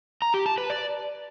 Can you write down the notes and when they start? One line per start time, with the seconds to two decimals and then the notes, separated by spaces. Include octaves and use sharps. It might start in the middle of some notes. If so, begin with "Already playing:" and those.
0.22 A#5
0.34 G4
0.46 A5
0.58 B4
0.70 D5